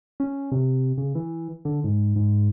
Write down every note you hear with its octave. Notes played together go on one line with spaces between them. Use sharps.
C#4
C3
C#3
E3
D3
G#2
G#2